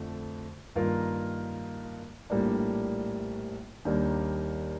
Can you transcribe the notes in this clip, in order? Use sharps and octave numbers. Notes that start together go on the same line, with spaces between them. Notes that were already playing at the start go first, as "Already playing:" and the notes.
Already playing: F2 D3 A3
G2 D#3 A#3 F4 A#4
A#1 A2 G3 A#3 D4
D#2 D#3 G3 A#3 D4